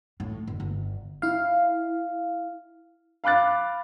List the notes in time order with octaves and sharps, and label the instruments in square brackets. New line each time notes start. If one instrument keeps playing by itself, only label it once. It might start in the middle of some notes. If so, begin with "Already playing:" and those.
[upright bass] A2
G1
G1
[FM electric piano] E4 F5
[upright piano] F5 B5 D6 F#6 A6